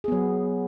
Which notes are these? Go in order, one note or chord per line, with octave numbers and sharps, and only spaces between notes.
F#3 B3 G#4